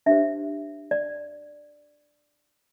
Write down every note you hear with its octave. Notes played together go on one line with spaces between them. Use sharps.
D4 G4 C5 E5
D5